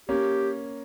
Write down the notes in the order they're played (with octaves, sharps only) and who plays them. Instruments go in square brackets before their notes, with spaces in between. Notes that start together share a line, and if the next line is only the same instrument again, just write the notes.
[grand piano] A#3 C#4 [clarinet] G4